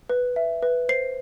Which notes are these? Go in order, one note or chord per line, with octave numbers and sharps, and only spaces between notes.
B4
E5
B4
C5 C7